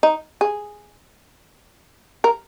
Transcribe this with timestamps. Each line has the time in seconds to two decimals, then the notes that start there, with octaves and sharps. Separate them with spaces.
0.03 D#4
0.41 G#4
2.24 A#4